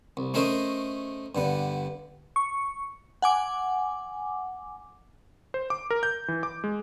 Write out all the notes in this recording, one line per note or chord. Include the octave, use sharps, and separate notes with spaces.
C2
A3 C#4 A#4 C5 D#5
G2 D3 B3
C#6
F#5 G#5 D6
C5
D6
A#4
G6
E3
D6
G#3